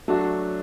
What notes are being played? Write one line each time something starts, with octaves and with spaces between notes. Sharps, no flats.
F#3 A3 D4 F#4